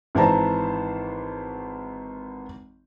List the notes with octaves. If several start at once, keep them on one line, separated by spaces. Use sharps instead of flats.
G#1 E3 C5 A5 A#5